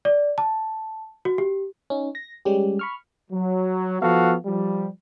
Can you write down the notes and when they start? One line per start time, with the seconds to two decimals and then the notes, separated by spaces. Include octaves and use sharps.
0.05 D5
0.38 A5
1.25 F#4
1.38 G4
1.90 C#4 D#4
2.15 A#6
2.45 G3 G#3 C#4 G4
2.79 B5 C#6 F6
3.31 F#3
4.02 F3 B3 F#4 A4 F5
4.46 F3 G3